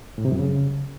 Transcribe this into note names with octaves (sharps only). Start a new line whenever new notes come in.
A2
C3
F#2
C#3